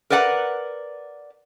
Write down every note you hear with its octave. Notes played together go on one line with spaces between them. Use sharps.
A#4 B4 D5 F#5 A#5